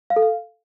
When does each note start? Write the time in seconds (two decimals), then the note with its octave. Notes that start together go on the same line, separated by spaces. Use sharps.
0.10 F5
0.16 A4
0.22 F5